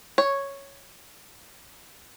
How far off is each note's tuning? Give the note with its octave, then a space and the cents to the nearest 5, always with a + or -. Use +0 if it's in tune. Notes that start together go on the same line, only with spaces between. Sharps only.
C#5 -5